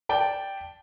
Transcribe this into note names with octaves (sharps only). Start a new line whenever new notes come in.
D5 G5 A5